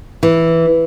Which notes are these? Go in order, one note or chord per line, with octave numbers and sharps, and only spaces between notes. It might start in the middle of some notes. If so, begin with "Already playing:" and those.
E3